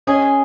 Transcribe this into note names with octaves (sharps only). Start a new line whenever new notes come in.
C#4 G#4 D#5 G#5